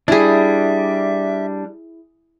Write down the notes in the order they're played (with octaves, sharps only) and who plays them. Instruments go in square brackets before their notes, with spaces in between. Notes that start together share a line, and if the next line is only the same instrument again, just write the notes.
[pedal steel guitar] G3 D4 [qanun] E4 G#4 [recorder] E5